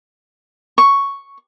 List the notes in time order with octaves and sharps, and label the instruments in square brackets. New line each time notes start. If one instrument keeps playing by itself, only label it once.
[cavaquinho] C#6